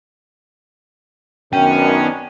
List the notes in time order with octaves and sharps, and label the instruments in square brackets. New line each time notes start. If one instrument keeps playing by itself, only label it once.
[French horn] F#2 [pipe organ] D#3 B3 D4 [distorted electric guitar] C#4 [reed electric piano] G5